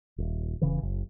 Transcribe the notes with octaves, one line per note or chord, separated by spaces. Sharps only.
D#1
E1 C#3 E3
F#1